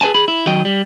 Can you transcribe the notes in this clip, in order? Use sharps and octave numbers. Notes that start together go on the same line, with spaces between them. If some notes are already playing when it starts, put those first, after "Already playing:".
G#4 B4 D#5 G#5 A5
G#4 B5
E4
D#3 F#3 D#5 G5
G3